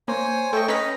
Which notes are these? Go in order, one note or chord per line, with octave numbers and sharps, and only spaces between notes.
A#3 C5 C#5 G#5
A3 A4 D#5 G5 C#6
C#4 B4 D#5 A#5 B6